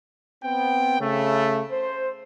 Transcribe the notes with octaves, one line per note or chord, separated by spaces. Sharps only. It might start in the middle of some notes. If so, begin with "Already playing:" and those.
B3 C4 G5
C#3 A3
C5